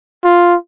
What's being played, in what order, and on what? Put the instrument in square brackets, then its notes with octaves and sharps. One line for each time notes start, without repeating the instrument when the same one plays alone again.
[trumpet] F4